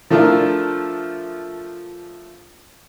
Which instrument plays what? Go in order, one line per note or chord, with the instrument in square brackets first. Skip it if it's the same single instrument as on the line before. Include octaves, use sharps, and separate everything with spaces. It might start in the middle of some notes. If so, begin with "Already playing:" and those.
[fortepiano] F3 A3 D4 F4 A#4